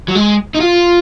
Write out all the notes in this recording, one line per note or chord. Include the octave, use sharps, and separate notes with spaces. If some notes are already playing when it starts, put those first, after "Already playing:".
F#3
G#3
D#4
F4